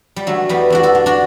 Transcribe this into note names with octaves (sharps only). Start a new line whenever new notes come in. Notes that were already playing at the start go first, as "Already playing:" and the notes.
G3
D3 F#3 A3
E2 G3 B3
E2 D4 F#4
F#4 A4
D3
D4 F#4